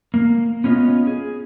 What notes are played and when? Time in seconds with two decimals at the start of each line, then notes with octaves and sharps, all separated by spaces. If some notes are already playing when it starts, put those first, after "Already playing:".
0.14 A#3
0.64 B3 C#4 F4 B4 D#5
1.07 G#4